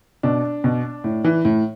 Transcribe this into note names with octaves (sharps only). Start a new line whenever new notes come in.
B2 D4
B2
A2
E3
A2